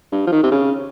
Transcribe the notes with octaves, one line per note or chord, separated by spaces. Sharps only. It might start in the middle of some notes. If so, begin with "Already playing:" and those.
G2
F3
D#3
C3
C#3